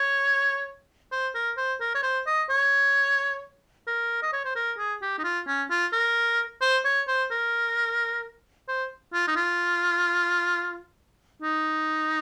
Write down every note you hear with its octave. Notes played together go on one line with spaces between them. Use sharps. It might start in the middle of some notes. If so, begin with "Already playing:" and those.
Already playing: C#5
C5
A#4
C5
A#4
C#5
C5
D#5
C#5
A#4
D#5
C#5
C5
A#4
G#4
G4
D#4
F4
C#4
F4
A#4
C5
C#5
C5
A#4
C5
F4
D#4
F4
D#4